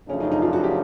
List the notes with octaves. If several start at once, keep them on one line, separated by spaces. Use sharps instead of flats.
F#2 C#3 F3 A3 C#4 D4
D#4
D#4
F4
F#4
G4